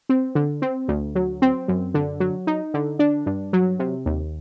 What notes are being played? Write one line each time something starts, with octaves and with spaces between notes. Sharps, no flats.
C4
D3
C4
D2
F#3
C4
F#2
D3
F#3
D#4
D3
D4
G2
F#3
C3
D#2